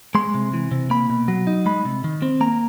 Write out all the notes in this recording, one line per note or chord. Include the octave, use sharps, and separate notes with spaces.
G#3 C6
C3
E3
C3
A#3 B5
B2
F#3
D#4
G#3 B5
C3
D#3
C4
A#3 A#5